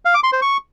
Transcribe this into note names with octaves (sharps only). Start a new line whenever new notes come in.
F5
D6
C6
C5
C#6